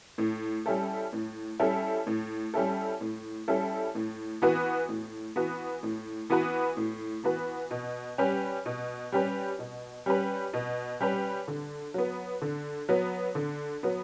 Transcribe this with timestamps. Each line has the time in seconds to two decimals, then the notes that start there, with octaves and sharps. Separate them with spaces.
0.18 A2
0.66 G3 C#4 E4 A4
1.13 A2
1.60 G3 C#4 E4 A4
2.07 A2
2.54 G3 C#4 E4 A4
3.01 A2
3.48 G3 C#4 E4 A4
3.95 A2
4.42 E3 B3 F#4 B4
4.89 A2
5.36 E3 B3 F#4 B4
5.83 A2
6.30 E3 B3 F#4 B4
6.77 A2
7.24 E3 B3 F#4 B4
7.71 B2
8.18 G3 C#4 G4 B4
8.66 B2
9.12 G3 C#4 G4 B4
9.59 B2
10.06 G3 C#4 G4 B4
10.53 B2
11.00 G3 C#4 G4 B4
11.48 D3
11.94 F#3 B3
12.42 D3
12.89 F#3 B3
13.35 D3
13.83 F#3 B3